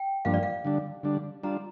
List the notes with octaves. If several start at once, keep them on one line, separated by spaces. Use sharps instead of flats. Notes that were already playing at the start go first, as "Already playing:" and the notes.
Already playing: G5
G2 F3 A#3 D4 F5
D5
F5
D3 G3 D4
D3 G3 D4
G3 D4 F4 A#5